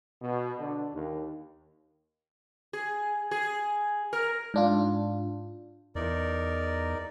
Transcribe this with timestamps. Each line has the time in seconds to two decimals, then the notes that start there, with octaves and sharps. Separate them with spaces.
0.22 B2
0.58 D3
0.94 D#2
2.73 G#4
3.31 G#4
4.13 A#4
4.54 G#2 D4 F4
5.95 E2 D#4 A#4 D5